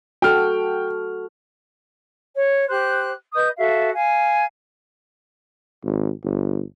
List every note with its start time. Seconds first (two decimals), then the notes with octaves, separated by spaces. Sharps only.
0.22 F#4 A4 G5 F6
2.35 C#5
2.69 G4 C5 F#6
3.33 B4 D#5 D#6 G6
3.58 F#4 A4 E5 F5
3.94 F5 G#5
5.84 G#1
6.24 G1